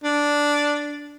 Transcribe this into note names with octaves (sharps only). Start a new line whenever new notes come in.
D4